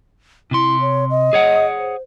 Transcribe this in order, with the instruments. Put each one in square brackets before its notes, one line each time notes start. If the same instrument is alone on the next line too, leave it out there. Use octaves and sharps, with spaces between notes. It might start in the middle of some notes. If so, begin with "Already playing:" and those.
[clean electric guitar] C3 C6 [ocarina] E4
[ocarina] C#5
D#5
[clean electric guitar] G#4 C#5 F#5
[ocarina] C5